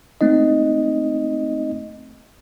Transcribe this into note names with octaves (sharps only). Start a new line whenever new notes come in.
A3 C4 D#4 D#5